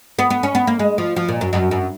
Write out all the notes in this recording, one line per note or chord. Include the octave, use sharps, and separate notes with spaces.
B3
B3
C#4
B3
A#3
G#3
F3
F3
A#2
F#2
F#2
F#2